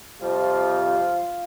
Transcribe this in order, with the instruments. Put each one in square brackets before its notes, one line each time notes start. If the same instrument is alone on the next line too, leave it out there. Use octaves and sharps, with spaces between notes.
[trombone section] F2 C3 F3 G3 F4